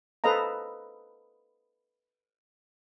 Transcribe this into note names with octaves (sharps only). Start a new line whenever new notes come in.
A4 B4 C5 D#5 F5 A#5